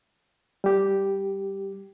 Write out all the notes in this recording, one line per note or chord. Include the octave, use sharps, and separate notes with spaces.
G3 G4